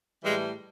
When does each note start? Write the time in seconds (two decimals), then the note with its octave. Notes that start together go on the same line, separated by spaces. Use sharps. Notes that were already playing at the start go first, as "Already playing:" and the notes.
0.24 A2 E3 G3 G#3